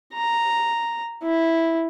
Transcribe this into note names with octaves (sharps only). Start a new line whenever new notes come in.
A#5
E4